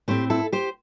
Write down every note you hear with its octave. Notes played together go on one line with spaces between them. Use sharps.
A2 A3 C4 G4 C5
E4 A4
G4 C5